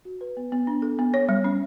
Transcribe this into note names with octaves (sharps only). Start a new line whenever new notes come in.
F#4
B4
B3
B3
D4
A4
B3
C#5
G3
C#4